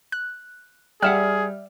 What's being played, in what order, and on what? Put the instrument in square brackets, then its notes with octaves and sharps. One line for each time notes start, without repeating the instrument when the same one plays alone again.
[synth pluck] F#6
[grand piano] G3 [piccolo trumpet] G#4 [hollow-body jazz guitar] D5 E5 F#5 [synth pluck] G5 F6